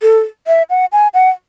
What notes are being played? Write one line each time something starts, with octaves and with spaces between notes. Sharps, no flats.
A4
E5
F#5
G#5
F#5